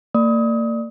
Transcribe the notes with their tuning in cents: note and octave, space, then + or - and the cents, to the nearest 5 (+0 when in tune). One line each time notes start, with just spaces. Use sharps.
A#3 -35 D5 +10 D#6 +30